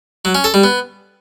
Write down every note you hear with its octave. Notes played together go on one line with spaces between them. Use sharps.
F#3
C#4
A4
G3
B3